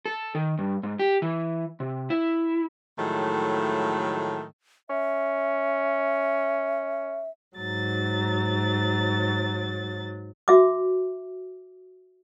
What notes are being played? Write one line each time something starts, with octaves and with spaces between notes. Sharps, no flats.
A4
D#3
G2
G#2
G4
E3
C3
E4
A2 D#3 F3 F#3 G#3 A3
C#4 E5
G#2 F#3 A6
F#4 E5 D6